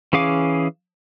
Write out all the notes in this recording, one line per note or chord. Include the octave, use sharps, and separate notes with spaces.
E3 C#4 G#4 F5 D6